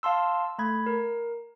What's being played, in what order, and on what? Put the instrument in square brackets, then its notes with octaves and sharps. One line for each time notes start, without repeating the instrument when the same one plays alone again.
[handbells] F5 A5 C6 E6
A3 B5 G#6
A#4